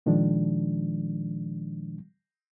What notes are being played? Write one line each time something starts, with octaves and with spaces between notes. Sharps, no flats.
A#2 D#3 F3 G#3 D4